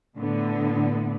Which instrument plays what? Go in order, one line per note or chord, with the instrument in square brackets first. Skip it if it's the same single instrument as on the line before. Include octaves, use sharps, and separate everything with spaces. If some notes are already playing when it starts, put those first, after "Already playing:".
[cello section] A2 D3 B3